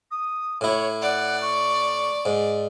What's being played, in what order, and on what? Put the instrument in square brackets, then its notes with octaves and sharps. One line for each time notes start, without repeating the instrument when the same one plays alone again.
[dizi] D#6
[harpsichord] A2 E4 [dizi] C#5
[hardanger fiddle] D5 [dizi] F#5
[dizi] C#6
[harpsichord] G#2